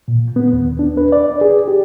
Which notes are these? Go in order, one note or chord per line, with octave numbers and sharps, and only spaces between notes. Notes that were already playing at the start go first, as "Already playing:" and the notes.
A#2
B3
D#2
D4
B4
D5
G#4
G4